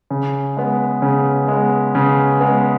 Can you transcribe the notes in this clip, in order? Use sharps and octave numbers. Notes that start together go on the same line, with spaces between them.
C#3
G#3 B3
C#3
G#3 B3
C#3
G#3 B3